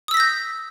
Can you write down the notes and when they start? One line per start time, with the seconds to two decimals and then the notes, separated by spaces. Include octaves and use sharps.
0.08 D#6
0.11 E6
0.14 B6
0.17 A#6
0.20 G6